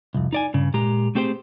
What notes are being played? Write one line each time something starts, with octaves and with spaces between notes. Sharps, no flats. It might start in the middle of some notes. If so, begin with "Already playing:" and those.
C2 F2
D#4 D5 G#5
G2 C#3
A#2 G#3 G4 A#5
A3 C4 G4 G#4 C5